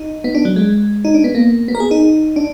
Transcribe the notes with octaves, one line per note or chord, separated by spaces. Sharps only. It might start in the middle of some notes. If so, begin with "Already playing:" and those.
Already playing: D#4
B3
D4
F#3
G#3
D#4
D4
B3
A#3
B3
A#4
G#4
D#4
D4